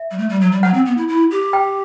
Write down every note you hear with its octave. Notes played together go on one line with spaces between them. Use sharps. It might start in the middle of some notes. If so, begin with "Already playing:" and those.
Already playing: E5
G3
A3
G3
F#3
G3
F#3 F#5
C4
B3
E4
E4
G4
G5